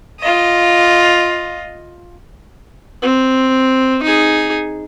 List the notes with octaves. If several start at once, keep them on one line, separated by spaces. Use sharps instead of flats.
F4 D#5
C4
D#4 G#4